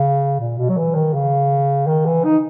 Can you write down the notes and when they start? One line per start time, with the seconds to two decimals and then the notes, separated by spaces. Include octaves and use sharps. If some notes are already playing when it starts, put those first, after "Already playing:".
Already playing: C#3
0.40 A#2
0.58 B2
0.69 F#3
0.77 E3
0.95 D#3
1.14 C#3
1.87 D#3
2.06 E3
2.24 D#4